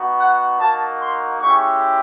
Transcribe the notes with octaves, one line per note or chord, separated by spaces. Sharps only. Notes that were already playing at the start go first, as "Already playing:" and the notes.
Already playing: B3 D#4 F#4
F#5
A#3 D#4 F#4 A5
C6
G#3 C#4 E4 G4 C#6